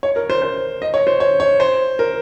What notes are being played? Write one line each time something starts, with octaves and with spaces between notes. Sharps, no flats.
C#5
A#4
C5
C5
D#5
C#5
C5
C#5
C#5
C5
A#4